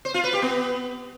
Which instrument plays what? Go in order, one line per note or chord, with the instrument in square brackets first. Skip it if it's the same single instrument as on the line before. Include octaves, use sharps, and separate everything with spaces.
[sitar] C5
F4
B4
G4
B3